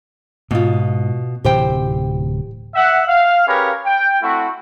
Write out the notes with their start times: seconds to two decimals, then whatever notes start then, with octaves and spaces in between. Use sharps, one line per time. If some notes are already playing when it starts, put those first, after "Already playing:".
0.51 G#2 B2 F4
1.44 D1 C3 E3 G4 C5 G5
2.75 E5 F#5
3.08 F5
3.47 C#4 G4 G#4 A#4 B4 C#5
3.85 G5
4.22 A3 C4 E4 F#4